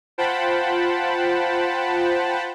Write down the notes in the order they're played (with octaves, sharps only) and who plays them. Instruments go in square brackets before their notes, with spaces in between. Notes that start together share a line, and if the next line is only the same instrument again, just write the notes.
[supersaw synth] F4 C5 F#5 G5 A5 B5